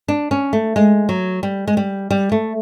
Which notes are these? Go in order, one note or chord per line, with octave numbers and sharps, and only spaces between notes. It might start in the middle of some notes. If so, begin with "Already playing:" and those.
D4
C#4
A3
G#3
F#3
G3
G#3
G3
G3
A3